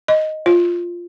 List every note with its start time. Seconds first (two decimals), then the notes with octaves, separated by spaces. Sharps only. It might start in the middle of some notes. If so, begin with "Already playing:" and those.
0.08 D#5
0.46 F4